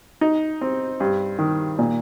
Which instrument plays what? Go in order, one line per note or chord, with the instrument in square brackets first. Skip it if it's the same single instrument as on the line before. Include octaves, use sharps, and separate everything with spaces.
[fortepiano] D#4
C4
G2
D#3
A#2